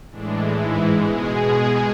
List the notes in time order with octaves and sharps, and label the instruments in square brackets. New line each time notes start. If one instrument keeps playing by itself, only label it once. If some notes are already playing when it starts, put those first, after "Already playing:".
[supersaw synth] A2 E3 G#3 D4
G#2 E3 G#3 E4
B2 G#3 G#4
B2 G#3